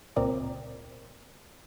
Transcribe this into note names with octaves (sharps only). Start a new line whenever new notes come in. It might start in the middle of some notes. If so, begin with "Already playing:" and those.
C#2 A#2 C4 A#4 D5